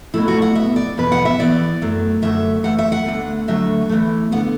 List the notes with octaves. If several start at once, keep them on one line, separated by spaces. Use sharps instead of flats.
B2 F#3 A3 E4
F#4
F#5
B2 B3 E5
D5
E2 B2 B3 B4
F#5
E5
E2 E3 B3 D5
F#2 F#3 A3
F#2 D3 F#3 A3 E5
F#2 E3 A3 F#5
E5
F#5
D2 D3 A3
D2 D3 F#3 A3 E5
E2 E3 A3
D3 B3 F#5